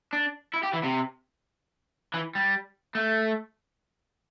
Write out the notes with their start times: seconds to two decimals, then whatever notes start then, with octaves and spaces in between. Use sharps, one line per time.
0.13 D4
0.54 E4
0.63 G4
0.74 E3
0.84 C3
2.14 E3
2.35 G3
2.95 A3